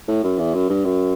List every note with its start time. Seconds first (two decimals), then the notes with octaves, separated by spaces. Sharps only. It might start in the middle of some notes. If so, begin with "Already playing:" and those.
0.08 A2
0.24 F#2
0.39 E2
0.55 F#2
0.70 G2
0.85 F#2